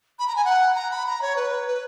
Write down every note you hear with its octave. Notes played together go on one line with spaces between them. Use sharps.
B5
A#5
G#5
F#5
A#5
B5
A#5
C#5
B4
B4